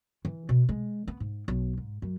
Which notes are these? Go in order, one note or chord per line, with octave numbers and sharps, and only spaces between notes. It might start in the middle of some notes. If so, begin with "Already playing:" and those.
E3
B2
G#3
B3
G#2
B1
G#2
F#2